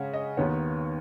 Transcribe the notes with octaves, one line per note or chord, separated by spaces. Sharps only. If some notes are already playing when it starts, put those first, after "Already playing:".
Already playing: C#3 G#3 C#4 F#5 G#5
D#5
D#2 D#3 B3 C#5